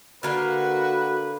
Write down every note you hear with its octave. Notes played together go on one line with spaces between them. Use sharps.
D3 A#3 F#4 B4 F5